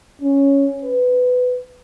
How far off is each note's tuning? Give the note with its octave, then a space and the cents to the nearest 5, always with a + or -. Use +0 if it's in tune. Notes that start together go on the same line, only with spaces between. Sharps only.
C#4 +0
B4 +15